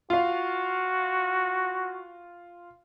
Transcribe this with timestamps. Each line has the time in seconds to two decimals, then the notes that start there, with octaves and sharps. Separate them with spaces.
0.10 F4 F#4 F5